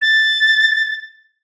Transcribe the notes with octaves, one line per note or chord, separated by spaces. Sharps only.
A6